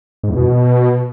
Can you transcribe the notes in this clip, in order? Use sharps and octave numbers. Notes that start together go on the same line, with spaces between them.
G#2
E2
B2